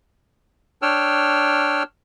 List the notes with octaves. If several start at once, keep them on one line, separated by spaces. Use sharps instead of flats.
D4 C#5 G5 E6 F6